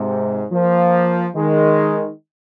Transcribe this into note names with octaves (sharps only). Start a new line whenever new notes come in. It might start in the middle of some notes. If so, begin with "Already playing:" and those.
Already playing: G#2 C3
F3 A#3
D#3 G#3